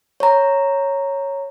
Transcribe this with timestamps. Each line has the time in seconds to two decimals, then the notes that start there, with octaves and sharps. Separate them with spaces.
0.20 C#5 A#5